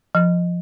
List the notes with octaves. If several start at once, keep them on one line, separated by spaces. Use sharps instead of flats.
F3